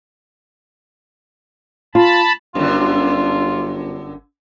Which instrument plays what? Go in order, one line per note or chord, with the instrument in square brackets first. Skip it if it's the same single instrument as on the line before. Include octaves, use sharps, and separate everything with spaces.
[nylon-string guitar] F4 [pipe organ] A5 B5
[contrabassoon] G1 [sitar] F#2 D3 [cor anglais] F4